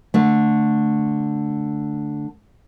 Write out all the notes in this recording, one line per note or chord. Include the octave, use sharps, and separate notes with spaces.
D3 A3